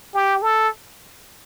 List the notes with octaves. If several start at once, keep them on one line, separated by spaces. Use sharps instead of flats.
G4
A4